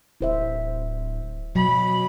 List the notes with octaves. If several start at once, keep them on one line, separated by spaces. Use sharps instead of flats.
D1 E4 C5 E5
B2 F#3 B5